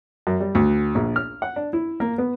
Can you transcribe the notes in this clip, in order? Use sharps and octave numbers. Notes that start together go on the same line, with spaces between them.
F#2
G3
D2
A#1
F6
F#5
D4
E4
A#3
B3